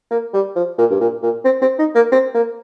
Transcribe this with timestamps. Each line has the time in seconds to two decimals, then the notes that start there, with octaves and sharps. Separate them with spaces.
0.11 A#3
0.33 G3
0.56 F3
0.78 A#2
0.90 G2
1.00 A#2
1.23 A#2
1.45 C4
1.61 C4
1.79 D#4
1.95 A#3
2.12 C4
2.34 A#3